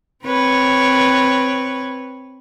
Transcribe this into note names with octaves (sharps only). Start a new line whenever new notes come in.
C4 B4 C#5